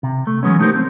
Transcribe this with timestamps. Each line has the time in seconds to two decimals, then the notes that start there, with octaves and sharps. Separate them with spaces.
0.03 C3
0.27 A3
0.43 E3 F#3 G#3 B3 C#4
0.59 A3 D#4 G4 A#4 C5
0.75 C4